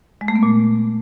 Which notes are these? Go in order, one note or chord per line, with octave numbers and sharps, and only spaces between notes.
G#3
A3
B3
A#2